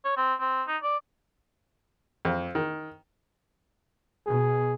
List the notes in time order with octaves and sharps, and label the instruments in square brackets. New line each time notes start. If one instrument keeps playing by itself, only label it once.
[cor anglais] C#5
C4
C4
D#4
D5
[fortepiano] F2
D#3
[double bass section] B2 [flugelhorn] G#4